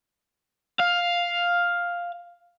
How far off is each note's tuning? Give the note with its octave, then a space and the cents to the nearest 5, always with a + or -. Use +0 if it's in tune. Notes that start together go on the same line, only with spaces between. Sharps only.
F5 +5